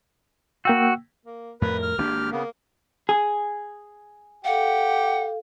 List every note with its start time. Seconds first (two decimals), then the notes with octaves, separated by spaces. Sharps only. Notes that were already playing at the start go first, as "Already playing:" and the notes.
0.65 A#3 F#4 G5 E6
1.25 A#3
1.61 F2 A2 A#4 B4
1.82 F6
1.98 G#1 A#3 D4 G4
2.32 C#3 A#3 B3
3.09 G#4
4.45 G4 A4 F5 F#5